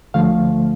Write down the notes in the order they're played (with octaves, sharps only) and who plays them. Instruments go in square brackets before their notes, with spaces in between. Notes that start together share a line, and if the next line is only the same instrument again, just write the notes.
[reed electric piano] D2 D3 F3 A3 F5